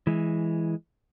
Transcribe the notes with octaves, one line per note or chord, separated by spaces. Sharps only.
E3 G#3